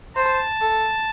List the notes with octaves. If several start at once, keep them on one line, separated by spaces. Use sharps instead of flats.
C5 A5
A4